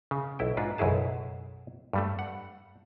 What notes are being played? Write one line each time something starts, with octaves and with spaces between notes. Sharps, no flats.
C#3
B1 E4 G5
G#2 D4 F4 F#4 B4
B1 F#2 C#3 E4 G#4 A5
G2 G3 A3
F#5